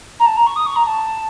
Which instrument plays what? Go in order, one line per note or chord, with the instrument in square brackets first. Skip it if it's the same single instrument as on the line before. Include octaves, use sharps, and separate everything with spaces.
[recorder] A#5
A5
A#5
C#6
D#6
C#6
A#5
A5